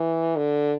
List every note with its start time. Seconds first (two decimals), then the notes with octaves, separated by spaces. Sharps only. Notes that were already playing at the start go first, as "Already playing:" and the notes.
Already playing: E3
0.36 D3